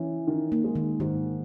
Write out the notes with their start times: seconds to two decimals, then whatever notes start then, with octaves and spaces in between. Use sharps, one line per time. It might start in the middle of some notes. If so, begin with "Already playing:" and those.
Already playing: E3 C#4
0.27 D#3
0.52 A#3
0.64 G#3
0.75 D#3
1.00 G#2 D#3